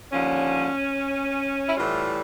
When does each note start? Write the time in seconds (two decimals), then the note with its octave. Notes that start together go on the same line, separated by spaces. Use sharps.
0.12 D#2 D3 F3 C#4
1.67 E4
1.76 A2 E3 G3 F4